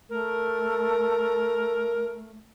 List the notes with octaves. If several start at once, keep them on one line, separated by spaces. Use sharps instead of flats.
A3 A#4